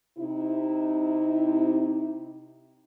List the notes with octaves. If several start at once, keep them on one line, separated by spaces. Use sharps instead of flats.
C3 D#4 E4